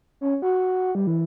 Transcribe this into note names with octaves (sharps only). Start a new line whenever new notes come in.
C#4
F#4
G3
E3